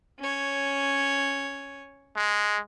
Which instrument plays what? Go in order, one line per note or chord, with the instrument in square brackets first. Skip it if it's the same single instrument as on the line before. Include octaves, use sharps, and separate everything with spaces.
[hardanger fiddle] C#4 C#5
[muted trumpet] G#3